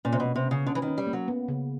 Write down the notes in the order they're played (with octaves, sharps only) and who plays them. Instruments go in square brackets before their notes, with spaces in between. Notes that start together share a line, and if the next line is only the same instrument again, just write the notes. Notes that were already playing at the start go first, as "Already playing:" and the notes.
[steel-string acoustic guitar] A#2 [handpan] C#4
[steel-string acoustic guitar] C3
B2
[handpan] A#3
[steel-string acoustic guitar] C3
[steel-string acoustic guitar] C#3 [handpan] C#4
[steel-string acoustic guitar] D3 [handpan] C#4
[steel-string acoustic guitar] E3
D#3
[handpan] C#4
[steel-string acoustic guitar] G3
[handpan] A#3
[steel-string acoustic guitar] F#3
[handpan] B3
C#3